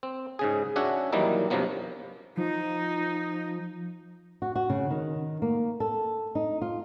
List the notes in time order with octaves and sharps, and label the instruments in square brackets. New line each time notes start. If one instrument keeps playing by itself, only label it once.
[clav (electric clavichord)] C4
G#2 C#3 G#4
C#4 D4 F#4 C#5 E5 F#5
D#3 E3 F#3 G3 A#3 D#4
G2 C3 F3 F#3 A#3 B3
[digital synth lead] F3 [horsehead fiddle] D#4
[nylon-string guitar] F#4
F#4
C#3
D#3
A#3
A4
D#4
F4